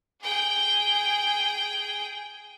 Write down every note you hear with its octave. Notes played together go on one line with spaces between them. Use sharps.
G#4 G5